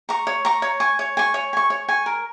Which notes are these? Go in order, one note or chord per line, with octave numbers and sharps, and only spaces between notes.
A#5 C#6
C#5
A#5 C#6
C#5
G#5 C#6
C#5
G#5 C#6
C#5
G#5 C#6
C#5
G#5 C#6
A#4